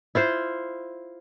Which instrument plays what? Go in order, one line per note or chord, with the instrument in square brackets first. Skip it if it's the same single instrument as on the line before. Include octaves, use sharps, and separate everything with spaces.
[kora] E4 F4 C5